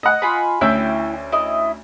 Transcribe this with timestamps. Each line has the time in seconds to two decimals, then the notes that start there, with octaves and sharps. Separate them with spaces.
0.03 D#5 F#5
0.22 F4 G#5 B5
0.61 D2 C#4 E4 G5 E6
1.32 E4 D#5